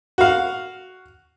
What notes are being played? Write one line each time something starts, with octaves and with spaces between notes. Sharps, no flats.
F#4 F5